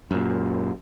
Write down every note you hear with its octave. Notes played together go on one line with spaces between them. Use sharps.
F#2 A#2